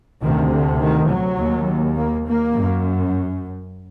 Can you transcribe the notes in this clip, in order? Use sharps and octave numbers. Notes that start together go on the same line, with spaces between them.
D2 C3 D#3
D3
D#3
F#3
D#2
A#3
A#3
F#2